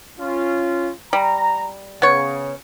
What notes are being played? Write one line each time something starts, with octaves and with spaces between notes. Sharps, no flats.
C#4 F4
G3 A#5
C#3 B3 C#5